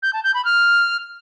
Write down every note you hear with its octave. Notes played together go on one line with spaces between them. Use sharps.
G6
A5
G6
B5
F6